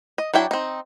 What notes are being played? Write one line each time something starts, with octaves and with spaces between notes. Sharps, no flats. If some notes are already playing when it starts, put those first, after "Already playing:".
D#5
F#3 D4 E4 G5
C4 D#4